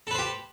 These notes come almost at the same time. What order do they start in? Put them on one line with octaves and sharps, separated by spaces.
A4 B4 C5 G4